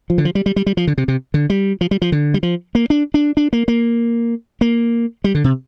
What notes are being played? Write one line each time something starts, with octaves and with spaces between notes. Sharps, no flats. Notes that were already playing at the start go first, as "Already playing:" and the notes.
F3
D3
F3
G3
G3
G3
G3
F3
D3
C3
C3
D3
G3
F3
G3
F3
D3
G3
F3
A#3
D4
D4
D4
A#3
A#3
A#3
G3
D3
C3